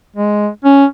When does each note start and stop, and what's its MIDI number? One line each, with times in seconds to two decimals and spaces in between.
0.16 0.48 56
0.65 0.85 61